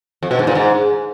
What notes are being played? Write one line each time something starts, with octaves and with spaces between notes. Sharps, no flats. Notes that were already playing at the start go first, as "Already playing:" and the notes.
F2
B2
G#2
A#2
G#2